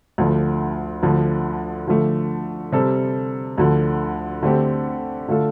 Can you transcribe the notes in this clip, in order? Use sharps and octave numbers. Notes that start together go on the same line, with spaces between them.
D2 D3 F3
D2 D3 F3
D3 F3 A3
C3 G3 C4 A4
D2 D3 F3
D3 A3 C4 G4
D3 A3 F4 A4